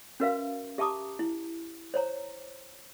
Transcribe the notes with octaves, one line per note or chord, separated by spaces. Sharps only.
C#4 F#4 A#4 B4 E5 F5
G4 E5 A5 A#5 D6 D#6
E4
C5 C#5 A#5